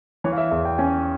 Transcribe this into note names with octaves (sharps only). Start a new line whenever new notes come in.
E3 C#5
F5
E5
E2 E5
G5
C#4 G#5